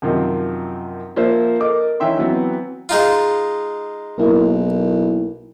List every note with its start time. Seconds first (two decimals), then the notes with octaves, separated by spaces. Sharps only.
0.02 F#2 C3 D#3 F3
1.16 F3 A#3 C5 E5
1.60 A4 A#4 D#5 D6
2.00 E3 C#4 D#4 E5 G5 C6
2.18 E3 F#3 B3 C4
2.89 G#3 D#4 F4
4.18 B1 A#3 E4 A#4